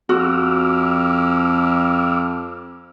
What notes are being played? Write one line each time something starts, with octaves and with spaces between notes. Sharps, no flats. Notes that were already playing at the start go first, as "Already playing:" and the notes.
F2 F#4 D6 E6 F6